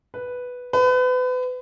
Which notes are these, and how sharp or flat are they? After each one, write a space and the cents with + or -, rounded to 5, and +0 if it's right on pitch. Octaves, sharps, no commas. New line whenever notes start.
B4 +0
B4 +35